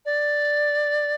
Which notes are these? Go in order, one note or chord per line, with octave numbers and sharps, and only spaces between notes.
D5